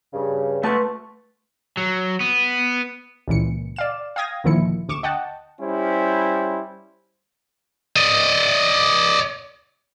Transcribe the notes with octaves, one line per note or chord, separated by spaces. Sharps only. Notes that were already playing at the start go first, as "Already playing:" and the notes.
G2 C#3
A3 B4 F#5 A5 C6 C#6
F#3
B3
C#2 A#2 E3 C#7
D5 F5 E7
F5 G5 D#6 G#6 A#6
D2 A#2 D#3 F3 E4 C#7
D2 C#6 D6 E7
D#5 F#5 G5 A5
G3 C#4 E4 C5
D5 D#5